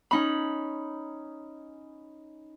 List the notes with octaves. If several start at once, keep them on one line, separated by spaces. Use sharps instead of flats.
C#4 D#4 B5